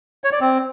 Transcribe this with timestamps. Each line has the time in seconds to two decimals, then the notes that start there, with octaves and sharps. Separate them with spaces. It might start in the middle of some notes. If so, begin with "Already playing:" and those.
0.24 C#5
0.32 D5
0.41 C4